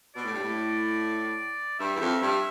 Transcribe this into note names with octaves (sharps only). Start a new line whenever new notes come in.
B2 D5
A2
G2
A2
G2 E5
E2
F2
G2